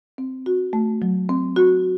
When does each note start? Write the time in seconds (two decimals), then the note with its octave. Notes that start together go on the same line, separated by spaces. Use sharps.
0.18 C4
0.46 F#4
0.73 A3
1.02 F#3
1.29 C4
1.56 F#4